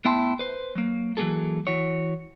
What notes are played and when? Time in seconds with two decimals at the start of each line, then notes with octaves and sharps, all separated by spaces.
0.05 A2 B3 E4 G5 A5 C6
0.39 B4 C5
0.75 F#3 A#3
1.17 E3 F#3 G#3 A#3 G#4 A4
1.67 E3 F#4 C#5